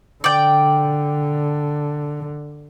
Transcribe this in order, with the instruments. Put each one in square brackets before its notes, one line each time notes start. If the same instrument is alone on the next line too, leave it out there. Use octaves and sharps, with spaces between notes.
[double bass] D3 [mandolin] D5 G5